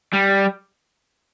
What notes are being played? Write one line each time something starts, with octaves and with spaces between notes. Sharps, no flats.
G3